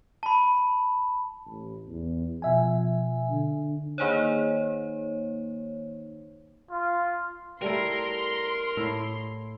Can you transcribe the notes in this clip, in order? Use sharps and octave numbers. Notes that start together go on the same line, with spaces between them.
A5 B5
A1
E2
B2 F3 E5 G#5
D3
D#3 A#3 D#4 C5 C#5
F4
G3 A3 E4 A#4 A#5 C6
A2 E4 E5